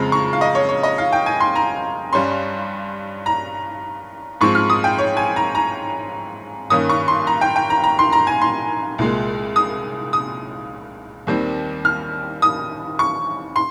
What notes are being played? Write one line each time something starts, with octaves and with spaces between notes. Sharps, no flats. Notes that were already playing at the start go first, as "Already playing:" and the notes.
Already playing: F2 C#3 G#3 C4 A#5
C#6
F5
D#5
C#5
C#5
D#5
F5
G5
G#5
C6
A#5
G2 G3 C#4 C6
A#5
G#2 F3 G#3 C4 C#6
F6
D#6
G5
C#5
G#5
A#5
A#5
G2 D#3 A#3 C#4 D#6
C#6
C6
A#5
G5
G5
A#5
A#5
C6
A#5
G#5
C6
C2 A#2 G#3
D#6
D#6
D#2 D#3 G3 C4
F6
D#6
C#6
C6